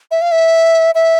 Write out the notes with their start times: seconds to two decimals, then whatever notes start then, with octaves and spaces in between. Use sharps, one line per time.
0.11 E5
0.22 F5
0.32 E5
0.95 E5